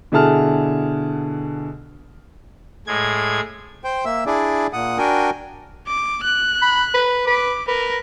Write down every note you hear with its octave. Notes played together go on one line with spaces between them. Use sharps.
B2 D3 E4 G#4 A5 F6
A2 G#3 G#6
C5 G5
A#3 E5 E6
D4 E4 G#4 D5
A#2 F#5 D#6
D4 F#4 A#4 G5 G#5
D6
F#6
B5
B4
B4 D6
A#4 B4